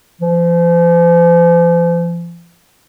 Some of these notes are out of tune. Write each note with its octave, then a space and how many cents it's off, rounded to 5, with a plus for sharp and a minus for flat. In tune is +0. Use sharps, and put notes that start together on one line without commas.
F3 -40